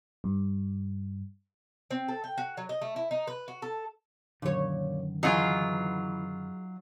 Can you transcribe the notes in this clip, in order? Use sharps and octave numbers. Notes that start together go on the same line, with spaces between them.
G2
C4
A4
G5
F#4
F#3
D#5
A3
E4
D#4
B4
F#4
A4
F#2 A#2 D3 D#3 C#5
E3 F#3 D#4 F4 F#4 G#4